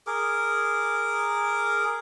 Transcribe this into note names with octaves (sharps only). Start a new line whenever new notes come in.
G#4 A#4 D6